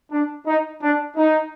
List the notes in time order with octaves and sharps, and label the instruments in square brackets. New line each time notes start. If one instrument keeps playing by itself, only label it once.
[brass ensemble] D4
D#4
D4
D#4